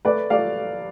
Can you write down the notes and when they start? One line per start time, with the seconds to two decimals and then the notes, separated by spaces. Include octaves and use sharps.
0.05 A3 B4 D5
0.30 A3 D5 F5